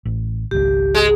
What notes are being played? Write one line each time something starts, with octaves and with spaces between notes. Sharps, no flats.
A1
G#1 C#2 G4
G#3